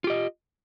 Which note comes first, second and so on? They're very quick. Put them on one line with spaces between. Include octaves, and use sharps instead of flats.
F4 G4 D#5